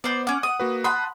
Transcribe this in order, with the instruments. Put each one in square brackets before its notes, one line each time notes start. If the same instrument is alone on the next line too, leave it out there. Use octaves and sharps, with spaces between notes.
[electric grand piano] B3 [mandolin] C5 D5
[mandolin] C#4 D6 [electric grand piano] F#5
[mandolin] D#6
[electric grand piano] A#3 F#4 B4
[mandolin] F#5 B5 [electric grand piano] A5 C6 D#6